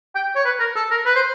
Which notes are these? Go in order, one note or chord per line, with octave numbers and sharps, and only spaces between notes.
G5
C#5
B4
A#4
A4
A#4
B4
C5